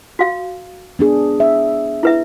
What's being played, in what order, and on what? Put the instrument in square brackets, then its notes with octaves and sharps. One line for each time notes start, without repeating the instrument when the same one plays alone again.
[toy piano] F#4 F5
[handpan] B3 D4 G#4
E5
[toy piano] E4 B4 E5